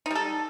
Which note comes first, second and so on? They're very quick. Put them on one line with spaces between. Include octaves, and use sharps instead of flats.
D#4 G3 A4